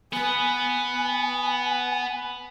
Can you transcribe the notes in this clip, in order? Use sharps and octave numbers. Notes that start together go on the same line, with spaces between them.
B3 B4 G#5